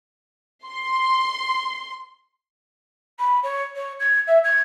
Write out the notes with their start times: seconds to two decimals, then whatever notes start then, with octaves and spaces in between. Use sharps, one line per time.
0.68 C6
3.19 B5
3.43 C#5
3.75 C#5
3.99 G#6
4.27 E5
4.44 G#6